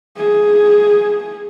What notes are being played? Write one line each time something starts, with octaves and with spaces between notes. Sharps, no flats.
G#4